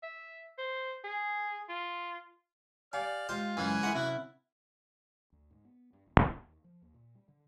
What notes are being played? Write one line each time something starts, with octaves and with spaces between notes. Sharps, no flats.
E5
C5
G#4
F4
G4 D5 F5 G#5 F6
G#3 F4 G4 C5
C#2 F#2 E3 G#5
G#3 E4 A#4 D#5 F#5 A#5
F#2 C3 E4 F#4
D2
G#2
B3
G2
D#1
F#2
D#2
F3
D#2
A#2
G3
D3